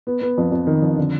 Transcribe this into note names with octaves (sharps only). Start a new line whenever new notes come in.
B3
B3
F2
F2
D#3
F2
D3